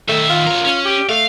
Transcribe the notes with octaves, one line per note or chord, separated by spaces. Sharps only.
D#3 A3 E5
F4
A#4 C#5
C#4
G4
A3 F5